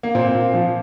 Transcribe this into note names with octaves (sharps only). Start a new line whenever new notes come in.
A#3
A#2 C4
A#2
F3